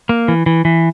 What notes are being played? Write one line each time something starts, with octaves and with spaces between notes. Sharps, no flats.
A#3
E3
E3
E3